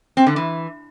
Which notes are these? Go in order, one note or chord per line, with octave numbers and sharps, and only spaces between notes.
C4
D3
E3